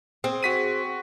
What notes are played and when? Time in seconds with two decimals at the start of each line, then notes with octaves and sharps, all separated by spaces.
0.24 C4 G#4
0.43 F#4 B6 D#7